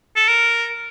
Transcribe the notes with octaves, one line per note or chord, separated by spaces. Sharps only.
A4
A#4